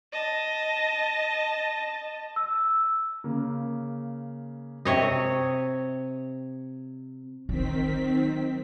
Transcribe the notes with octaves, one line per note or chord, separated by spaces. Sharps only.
D#5 A5
E6
C#3 A#3
C3 C#5 D#5
D#3 F#3 C4 B6